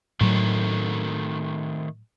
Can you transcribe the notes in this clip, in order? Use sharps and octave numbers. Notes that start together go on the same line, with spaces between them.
A2 D#3 F#3 A3 C4